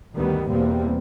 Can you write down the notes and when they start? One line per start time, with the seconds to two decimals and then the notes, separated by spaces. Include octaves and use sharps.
0.15 D2 G2 D#3 G3 B3
0.50 E2 B2 G3 A#3 C4